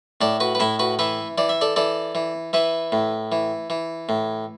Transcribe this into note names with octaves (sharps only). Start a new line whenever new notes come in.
A2 A4 D5
F#4 B4
B4
A2 E4 A4
F#4 B4
E3 B4 E5
E3 D5
E5
A4 D5
E3 A4 D5
E3
E3 B4 E5
A2
E3
E3
A2